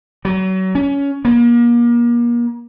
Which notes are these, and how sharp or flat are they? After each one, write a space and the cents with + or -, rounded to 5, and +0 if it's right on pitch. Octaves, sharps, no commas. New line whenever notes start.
F#3 +30
C#4 +20
A#3 +35